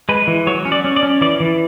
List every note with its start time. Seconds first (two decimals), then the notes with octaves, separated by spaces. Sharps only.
0.09 G#3 B4
0.27 E3
0.47 F#3 C#5
0.65 C#4
0.72 D5
0.84 C#4
0.96 D5
1.03 C#4
1.21 E3 D5
1.40 E3